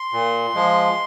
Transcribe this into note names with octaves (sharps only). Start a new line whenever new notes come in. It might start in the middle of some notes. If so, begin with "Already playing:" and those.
Already playing: C6
A#2
F3 G#3